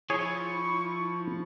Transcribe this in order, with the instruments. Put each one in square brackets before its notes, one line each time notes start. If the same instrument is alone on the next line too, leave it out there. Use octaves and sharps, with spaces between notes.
[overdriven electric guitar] F3 [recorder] E4 [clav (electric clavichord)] G#4 C#5 [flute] C#6